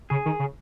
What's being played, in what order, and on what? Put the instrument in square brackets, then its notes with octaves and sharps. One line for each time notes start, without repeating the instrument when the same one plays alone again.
[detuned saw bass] C#3 [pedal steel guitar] G#4
[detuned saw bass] D#3
C#3